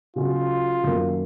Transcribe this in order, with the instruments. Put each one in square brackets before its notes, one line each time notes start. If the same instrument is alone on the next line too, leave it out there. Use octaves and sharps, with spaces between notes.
[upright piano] C#3 F#3 C#4 F#4 [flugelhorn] F4
[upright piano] F#2 D#3 A#3